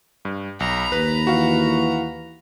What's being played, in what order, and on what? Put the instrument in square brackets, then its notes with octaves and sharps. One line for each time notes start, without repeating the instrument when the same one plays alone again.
[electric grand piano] G2
[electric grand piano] B1 [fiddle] A#5 B5
[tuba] D#2 [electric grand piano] B4
[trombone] E3 [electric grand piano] F#4 F5